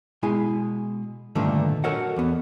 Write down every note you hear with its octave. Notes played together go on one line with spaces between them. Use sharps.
B2 G#3 E4 G#4 G#5
G2 A#2 D3 D#3 A3 B3
F#4 A4 A#4 C#5 D#5 F#5
E2 B3